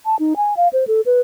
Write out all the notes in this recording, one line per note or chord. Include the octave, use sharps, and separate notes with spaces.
A5
D#4
G#5
F5
C5
A4
B4